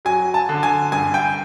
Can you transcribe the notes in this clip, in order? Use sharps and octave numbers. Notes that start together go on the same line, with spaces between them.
F#3 G#5
A5
D3
G#5
G2 G#5
G5